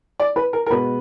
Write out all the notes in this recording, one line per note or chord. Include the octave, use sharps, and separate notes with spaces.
D5
B4
A#4
A#4
B2 G#3 B3 B4